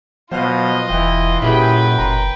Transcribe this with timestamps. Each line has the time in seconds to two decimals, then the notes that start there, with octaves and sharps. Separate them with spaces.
0.32 B2 F#3 F4 C5 D#5 F5 F6
0.90 E1 E3 G5
1.42 F#2 A#2 E4 G4 G#4 B4 G5
1.98 F#1 A#5 C6